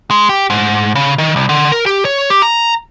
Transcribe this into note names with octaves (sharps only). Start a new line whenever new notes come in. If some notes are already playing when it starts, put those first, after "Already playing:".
G#3
G4
G#2
C#3
D#3
C2
D3
A#4
G4
C#5
G4
A#5